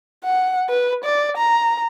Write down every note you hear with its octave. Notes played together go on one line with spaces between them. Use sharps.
F#5
B4
D5
A#5